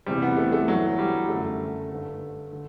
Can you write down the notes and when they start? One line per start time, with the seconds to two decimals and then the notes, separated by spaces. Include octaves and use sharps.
0.06 E2 C3 E3 G3
0.22 B3
0.37 A3
0.52 A3
0.68 G2 E3 F#3
0.99 G3
1.28 F#2 D3 A3
1.90 G2 D3
2.53 D3